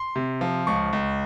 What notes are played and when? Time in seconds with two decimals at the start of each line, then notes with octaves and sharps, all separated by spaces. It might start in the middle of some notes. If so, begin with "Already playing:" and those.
Already playing: C6
0.16 C3
0.41 F3
0.67 C#2 C#6
0.93 C#2